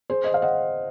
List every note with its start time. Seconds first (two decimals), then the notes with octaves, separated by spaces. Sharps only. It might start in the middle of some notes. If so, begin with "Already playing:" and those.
0.10 G#4 C5
0.24 D#5
0.34 F5
0.42 D#5 F#5